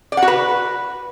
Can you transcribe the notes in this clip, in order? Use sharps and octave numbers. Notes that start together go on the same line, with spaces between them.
D5
F#5
F#4
B4